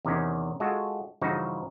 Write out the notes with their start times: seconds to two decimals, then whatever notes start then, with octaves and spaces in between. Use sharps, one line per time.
0.05 E2 C3 D#3 C#4
0.60 G#3 F4 F#4 A4
1.21 G2 C#3 E3 F3 D#4 F#4